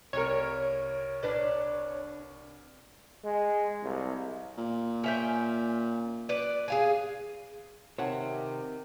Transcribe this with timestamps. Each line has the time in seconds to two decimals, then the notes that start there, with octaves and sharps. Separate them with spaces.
0.13 C2 A#4 C#5
1.23 D4 B4 D5
3.24 G#3
3.83 C2
4.58 A#2
5.04 C#4 E5 G5
6.29 B4 D5
6.68 G#4 F5 G#5
7.99 C3 D#3 C#5 F#5 A5